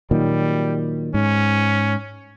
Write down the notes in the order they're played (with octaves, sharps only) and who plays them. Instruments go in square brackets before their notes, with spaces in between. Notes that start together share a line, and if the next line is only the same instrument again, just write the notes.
[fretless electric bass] A#2 D#3 F#3 [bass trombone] G3
[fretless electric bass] G#2 [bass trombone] C#4